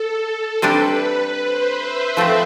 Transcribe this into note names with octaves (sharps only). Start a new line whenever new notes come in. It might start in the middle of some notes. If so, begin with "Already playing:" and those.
Already playing: A4
C3 G3 D4 G4 B4
C5
E5
F3 A3 C4